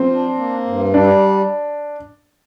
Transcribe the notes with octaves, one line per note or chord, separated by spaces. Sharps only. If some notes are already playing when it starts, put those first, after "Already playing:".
Already playing: F3 C4
D4
A#3
G2
G3 D4